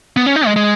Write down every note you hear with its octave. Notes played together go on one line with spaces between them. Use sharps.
B3
C#4
D#4
G#3
G#3